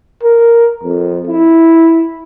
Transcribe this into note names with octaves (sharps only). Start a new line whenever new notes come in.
A#4
F2
E4